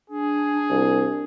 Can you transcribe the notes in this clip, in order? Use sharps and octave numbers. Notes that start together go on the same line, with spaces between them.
D4 G#4
C2